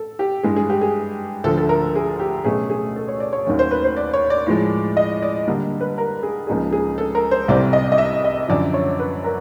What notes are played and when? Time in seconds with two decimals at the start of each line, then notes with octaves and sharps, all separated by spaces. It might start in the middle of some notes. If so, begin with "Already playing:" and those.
Already playing: A4
0.19 G4
0.43 G2 E3 G#3 G#4
0.56 G#4
0.70 G4
0.81 G#4
1.44 D2 D3 F3 A4
1.57 A4
1.69 A#4
1.95 G#4
2.20 G4
2.45 B2 F#3 A3 C#4 G#4
2.70 G#4
2.96 A4
3.08 C#5
3.20 D5
3.33 C#5
3.46 D#2 D#3 F#3 A3 C#4
3.59 C5
3.71 B4
3.84 C5
3.96 D5
4.13 C#5
4.30 D5
4.47 A2 F3 G#3
4.97 D#5
5.23 D5
5.47 D3 G3 A#3 D4
5.81 B4
5.98 A#4
6.23 G#4
6.47 C#2 C#3 F3 A#3 D#4 G#4
6.73 G#4
6.98 A4
7.15 A#4
7.31 C5
7.48 C2 C3 E3 G3 C4 D5
7.73 D#5
7.92 D#5
7.98 E5
8.24 D#5
8.48 F#2 D3 F3 D5
8.74 C#5
9.00 B4
9.24 A#4